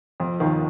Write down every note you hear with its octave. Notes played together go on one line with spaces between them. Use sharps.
F2 F3
D#2 D#3